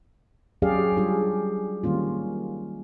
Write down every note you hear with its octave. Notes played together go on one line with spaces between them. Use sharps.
F#3 C#4 G4 G#4 D5 F5
G3 D4 F4 G4 G#4
D#3 G3 A#3 C#4 F4